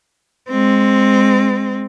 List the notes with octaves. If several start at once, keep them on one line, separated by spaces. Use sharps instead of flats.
G#3 C4